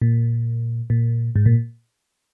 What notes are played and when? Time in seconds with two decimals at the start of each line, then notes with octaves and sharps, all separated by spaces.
0.02 A#2
0.90 A#2
1.36 G#2
1.46 A#2